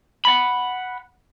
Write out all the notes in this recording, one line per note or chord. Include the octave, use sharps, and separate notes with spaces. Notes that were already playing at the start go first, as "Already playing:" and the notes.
F#5 B5